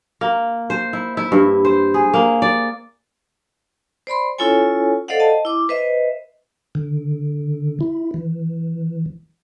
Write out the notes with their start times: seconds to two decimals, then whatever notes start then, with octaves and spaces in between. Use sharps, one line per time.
0.21 A#3
0.70 C5
0.93 E4
1.17 E4
1.32 G2
1.65 C5
1.94 G#4
2.14 A#3
2.42 D5
4.07 C5 D5 B5 C6
4.38 C#4 E4 F4 A4 C#5 G#5
5.08 A4 C5 D5 D#5 F5 F#5
5.20 D#5 A5
5.45 E4 D6
5.69 B4 C5 D#5 E5
6.75 D3
7.81 E4
8.14 E3